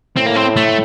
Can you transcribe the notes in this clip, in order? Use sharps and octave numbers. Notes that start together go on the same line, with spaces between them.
A2 C4
A#3
C4
A3